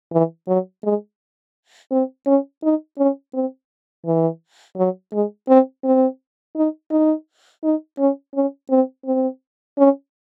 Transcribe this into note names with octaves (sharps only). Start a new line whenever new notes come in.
E3
F#3
G#3
C4
C#4
D#4
C#4
C4
E3
F#3
G#3
C4
C4
D#4
D#4
D#4
C#4
C#4
C4
C4
C#4